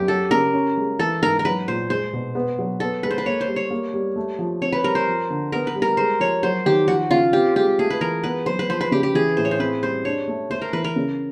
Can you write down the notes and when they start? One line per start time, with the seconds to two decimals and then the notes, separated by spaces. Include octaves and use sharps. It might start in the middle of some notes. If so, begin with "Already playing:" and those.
Already playing: F#2 G4
0.08 F#3 A4
0.31 C#3 A#4
0.54 C#4
0.77 G#3
0.99 E3 A4
1.22 G#2 A#4
1.39 A#4
1.45 F#3 B4
1.67 A#2 C5
1.90 G#3 C5
2.13 B2
2.35 B3
2.59 F#3
2.80 B3 A4
3.03 G#3 B4
3.11 C5
3.18 B4
3.26 A#3 C#5
3.41 C5
3.48 G3
3.56 C#5
3.71 A#3
3.94 G3
4.16 A3
4.39 F3
4.62 C4 C#5
4.73 B4
4.84 G3 A#4
4.95 C5
5.07 F3
5.30 D3
5.52 B3 A#4
5.67 B4
5.75 G3
5.82 A#4
5.97 G#3 C5
6.20 F3 C#5
6.43 F#3 C5
6.66 D#3 G4
6.88 F3 F#4
7.11 C#3 F4
7.33 C4 G4
7.56 G#3 G4
7.79 A3 G#4
7.90 B4
8.01 E3 A#4
8.24 B3 B4
8.46 F#3 C5
8.59 B4
8.69 F3 C5
8.81 B4
8.91 C#3 G4
9.03 G4
9.14 E3 G#4
9.37 A2 C5
9.45 C#5
9.51 C5
9.59 C4 B4
9.83 G3 C5
10.05 D4 C#5
10.28 A3
10.50 A3 C5
10.62 A#4
10.73 E3 B4
10.84 A#4
10.96 C#3